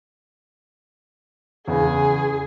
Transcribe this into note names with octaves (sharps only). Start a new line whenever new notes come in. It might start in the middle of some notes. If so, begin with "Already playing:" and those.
E2 C#3 B3 G#4